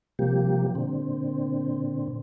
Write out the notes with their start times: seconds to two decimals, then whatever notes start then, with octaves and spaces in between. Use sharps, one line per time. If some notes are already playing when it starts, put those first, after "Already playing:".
0.19 C3 F3 G3 A#3 G4
0.75 A#2 D3 C4